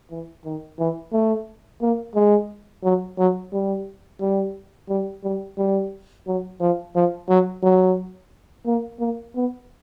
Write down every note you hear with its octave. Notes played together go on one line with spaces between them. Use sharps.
E3
D#3
E3
A3
A#3
G#3
F#3
F#3
G3
G3
G3
G3
G3
F#3
F3
F3
F#3
F#3
A#3
A#3
B3